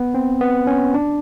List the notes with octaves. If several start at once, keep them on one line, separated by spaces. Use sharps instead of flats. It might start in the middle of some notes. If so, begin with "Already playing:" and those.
Already playing: B3
C4
B3
C#4
D4